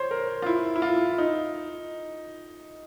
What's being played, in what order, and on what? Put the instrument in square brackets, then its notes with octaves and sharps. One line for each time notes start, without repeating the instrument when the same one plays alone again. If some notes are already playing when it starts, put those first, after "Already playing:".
Already playing: [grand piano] C5 C#5
A#4
F4
E4
E4
F4
D#4